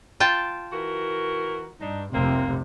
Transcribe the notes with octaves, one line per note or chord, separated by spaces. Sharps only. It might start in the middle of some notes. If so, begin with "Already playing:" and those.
F4 G5 A5
E3 F#4 A#4
G2 D4 D#4
F1 C2 C3 A#3 C4